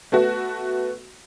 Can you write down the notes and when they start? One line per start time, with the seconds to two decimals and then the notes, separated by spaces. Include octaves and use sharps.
0.12 A3 B3 F#4